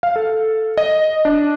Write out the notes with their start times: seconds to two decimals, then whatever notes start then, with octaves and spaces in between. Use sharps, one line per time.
0.03 F5
0.16 A4
0.78 D#5
1.25 D4